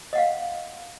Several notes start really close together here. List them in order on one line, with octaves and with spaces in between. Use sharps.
D#5 F#5 F5